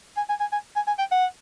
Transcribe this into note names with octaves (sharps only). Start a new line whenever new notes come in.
G#5
G#5
G#5
G#5
G#5
G#5
G5
F#5